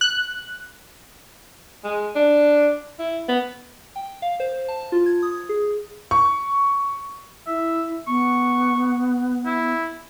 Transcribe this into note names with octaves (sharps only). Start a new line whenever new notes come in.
F#6
G#3
D4
E4
B3
G5
F5
C5
A5
F4
G#6
D#6
G#4
C#6
E4 E5
B3 C#6
E4